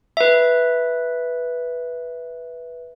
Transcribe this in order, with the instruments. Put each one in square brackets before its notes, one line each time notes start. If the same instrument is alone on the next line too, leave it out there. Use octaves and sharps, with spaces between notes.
[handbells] B4 E5